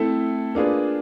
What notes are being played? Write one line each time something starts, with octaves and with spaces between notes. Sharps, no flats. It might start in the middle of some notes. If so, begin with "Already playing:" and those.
Already playing: A3 C4 E4 A4
A#3 D4 F4 G#4 B4